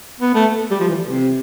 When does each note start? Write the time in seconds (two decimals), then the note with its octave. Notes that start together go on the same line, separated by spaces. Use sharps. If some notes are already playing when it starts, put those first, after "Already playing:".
0.20 B3
0.35 A3
0.71 G3
0.80 F3
0.89 E3
1.07 C3